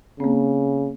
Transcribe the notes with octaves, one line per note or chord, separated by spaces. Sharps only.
C#3 A#3 C4